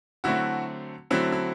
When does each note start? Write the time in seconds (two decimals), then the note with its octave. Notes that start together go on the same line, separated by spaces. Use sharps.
0.24 D3 F#3 A3 C4 E4 F#4
1.10 D3 F#3 A3 C4 E4
1.32 E4